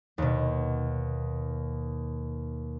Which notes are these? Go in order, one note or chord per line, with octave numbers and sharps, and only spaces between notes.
D#2 B2